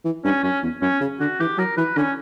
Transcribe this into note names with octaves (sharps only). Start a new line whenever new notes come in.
E3
G2 C#4
F#2 C#4
E2
F#2 C#4
C#3
D3 F#4
E3 G4
F#3 A#4
E3 B4
D3 C#4